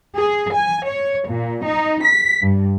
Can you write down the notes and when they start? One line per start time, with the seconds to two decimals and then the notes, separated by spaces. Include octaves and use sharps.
0.16 G#4
0.54 G#5
0.89 C#5
1.28 A#2
1.64 D#4
2.04 B6
2.42 G2